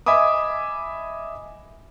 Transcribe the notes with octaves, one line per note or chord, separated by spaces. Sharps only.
D#5 E5 G#5 B5 D6 D#6